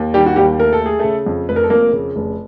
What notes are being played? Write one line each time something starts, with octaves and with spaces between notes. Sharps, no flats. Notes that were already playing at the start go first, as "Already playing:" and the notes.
Already playing: D#2
D#3 G3 G4
F#4
D#2 G3 G4
A3 A#4
A4
A3 G#4
C#3 A3 A4
F2
F1 B4
A#4
A4
F2 A#3 A#4
C#3
F1